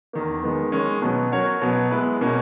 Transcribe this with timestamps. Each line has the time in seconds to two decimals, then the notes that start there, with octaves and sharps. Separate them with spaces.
0.13 E2 D#3 A#3
0.43 D#3 G#3 B3
0.72 D#3 G#3 C#4
1.02 B2 F#3 B3
1.32 F#3 C#4 F#4 A#4 C#5
1.61 B2 F#3 B3
1.91 G#3 B3 E4 B4
2.21 B2 A#3 C#4